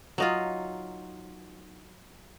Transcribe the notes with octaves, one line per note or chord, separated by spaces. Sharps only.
F#3 D#4 F4